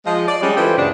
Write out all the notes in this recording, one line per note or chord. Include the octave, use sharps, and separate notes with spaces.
F3 G#3 D#5
D5
G3 G#3 C#4
E3 G#3 F4 G4 A4 C5
F#2 A#2 C#3 D4